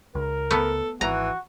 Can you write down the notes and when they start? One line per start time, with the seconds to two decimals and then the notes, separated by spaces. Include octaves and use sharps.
0.15 C#2 A#4
0.51 A3 B3 A4
1.01 G#1 E3 F#4 A#5